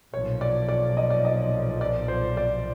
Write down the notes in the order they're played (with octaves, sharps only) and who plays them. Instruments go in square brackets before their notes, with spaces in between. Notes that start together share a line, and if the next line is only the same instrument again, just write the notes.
[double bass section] B1 A#2 F3 [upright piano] C#5
[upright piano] D5
D5
D#5
D5
D#5
D5
C5
D5